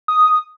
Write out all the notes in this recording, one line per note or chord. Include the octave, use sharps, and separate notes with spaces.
D#6